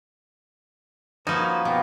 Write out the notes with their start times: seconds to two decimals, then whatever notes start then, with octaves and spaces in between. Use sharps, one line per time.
1.27 F3 A#3 C#4 D#4 F#4 B4
1.65 B2 B3 F4 G4